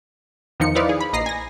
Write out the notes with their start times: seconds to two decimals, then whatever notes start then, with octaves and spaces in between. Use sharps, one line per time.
0.60 E2 D#3 F3 D#4 C#7
0.75 D#4 E4 B4 C5 D5 F5
0.89 G#4
1.01 B5
1.13 A#1 D#5 A#5 A#6 C7
1.26 G#5 A#6